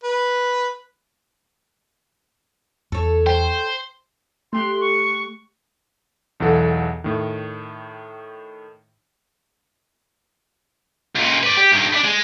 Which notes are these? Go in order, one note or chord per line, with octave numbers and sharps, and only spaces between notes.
B4
E2 A4 C#5
C5 G5
A3 G4 C6 F#6
C#6
B1 E2 E3 A4 F#5
A2 D#3
C#2 A#2
B4 D5
G4
G2 D#3
G3 D4
G#3